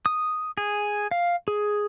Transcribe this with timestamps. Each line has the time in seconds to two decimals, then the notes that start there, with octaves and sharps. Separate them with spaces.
0.06 D#6
0.58 G#4
1.11 F5
1.48 G#4